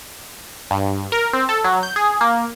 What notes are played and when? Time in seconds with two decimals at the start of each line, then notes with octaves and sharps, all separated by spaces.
0.71 G2
1.12 A#4
1.33 C4
1.49 A4
1.64 F#3
1.83 G6
1.96 G#4
2.21 A#3